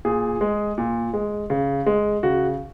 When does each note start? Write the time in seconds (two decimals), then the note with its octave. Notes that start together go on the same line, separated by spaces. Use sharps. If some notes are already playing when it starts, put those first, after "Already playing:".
0.05 A#2 G#4
0.41 G#3
0.78 A#2
1.14 G#3
1.50 C#3
1.86 G#3
2.23 C#3 F#4